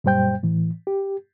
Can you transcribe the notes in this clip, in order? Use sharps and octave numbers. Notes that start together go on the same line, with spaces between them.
F#2 A#2 G3 C5 G5 G6
A2 E3
G4